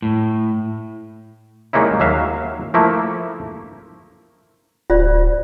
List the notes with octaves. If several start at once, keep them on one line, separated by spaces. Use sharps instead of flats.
A2
G3 G#3 A#3 C#4 D#4 E4
D#2 F#3 E5 F5
F3 A3 A#3 E4
D1 F4 C5 D5